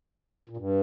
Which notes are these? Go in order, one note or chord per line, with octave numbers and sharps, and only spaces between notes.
A#2
G2